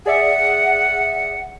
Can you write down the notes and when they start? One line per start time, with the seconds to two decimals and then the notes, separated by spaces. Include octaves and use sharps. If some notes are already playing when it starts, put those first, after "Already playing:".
0.06 G#4 D5 E5 F#5